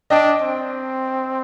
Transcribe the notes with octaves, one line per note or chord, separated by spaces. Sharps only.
D4 D#5 G5
C4